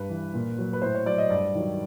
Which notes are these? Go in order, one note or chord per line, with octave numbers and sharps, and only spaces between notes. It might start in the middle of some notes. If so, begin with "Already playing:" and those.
Already playing: G2 B4
E3
A#2
F#3
B4
A2 C5
C#5
F#3 D5
D#5
G2 D5
D#3 F#3